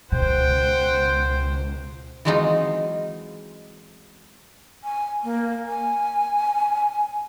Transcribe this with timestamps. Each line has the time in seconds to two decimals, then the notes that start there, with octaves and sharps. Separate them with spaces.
0.12 C#2 B2 C5 F#5 G5
2.25 E3 F#3 G#3 C4 D#4 F4
4.84 G#5
5.24 A#3
5.68 G#5